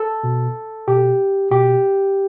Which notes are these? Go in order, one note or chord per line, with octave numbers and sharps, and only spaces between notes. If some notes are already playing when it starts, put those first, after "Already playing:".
Already playing: A4
B2
B2 G4
B2 G4